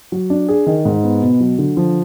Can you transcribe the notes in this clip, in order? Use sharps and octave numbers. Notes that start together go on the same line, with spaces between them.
F#3
D4
G#4
D#3
G#2
B3
B2
F#3
D3
F3